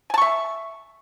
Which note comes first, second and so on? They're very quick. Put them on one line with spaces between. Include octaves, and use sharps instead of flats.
G#5 A5 C#6 E5